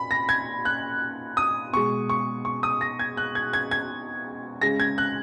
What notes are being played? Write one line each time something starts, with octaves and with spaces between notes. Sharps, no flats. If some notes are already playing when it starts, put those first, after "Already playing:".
Already playing: A#2 B5
A#6
G#6
F#6
D#6
B2 G#3 C#6
C#6
C#6
D#6
A#6
G#6
F#6
G#6
G#6
G#6
C#3 G#3 A#6
G#6
F#6